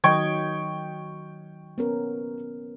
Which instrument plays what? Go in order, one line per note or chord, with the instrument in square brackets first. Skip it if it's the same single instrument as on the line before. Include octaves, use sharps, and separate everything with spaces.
[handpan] D#3 F#3 D#5 [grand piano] G5 C#6 G#6
[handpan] B3 C#4 A#4